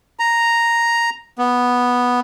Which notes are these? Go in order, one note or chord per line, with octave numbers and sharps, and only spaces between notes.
A#5
B3